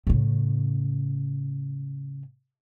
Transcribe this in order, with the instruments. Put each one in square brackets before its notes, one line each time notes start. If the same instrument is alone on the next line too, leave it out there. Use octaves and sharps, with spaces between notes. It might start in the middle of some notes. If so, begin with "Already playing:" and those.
[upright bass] A2 C#3